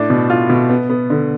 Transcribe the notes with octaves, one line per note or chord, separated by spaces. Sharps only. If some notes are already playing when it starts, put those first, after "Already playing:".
Already playing: A2 D4
B2
F4
B2
B3
B3
D3